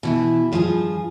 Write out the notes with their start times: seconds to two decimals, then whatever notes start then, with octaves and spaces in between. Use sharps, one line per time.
0.03 B2 E3 E4
0.52 G2 F3 F4 F#4 G#4